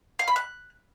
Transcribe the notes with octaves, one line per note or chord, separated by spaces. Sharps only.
F5
B5
F#6